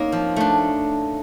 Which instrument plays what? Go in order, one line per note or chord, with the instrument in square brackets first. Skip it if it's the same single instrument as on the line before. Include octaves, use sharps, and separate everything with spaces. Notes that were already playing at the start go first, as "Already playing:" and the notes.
Already playing: [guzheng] A#3 C4 [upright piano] C#4 D#4
[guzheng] F3
A3 D4